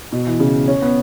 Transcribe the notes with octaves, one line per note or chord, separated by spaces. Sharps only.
B2
E3
C#3
C#4
B3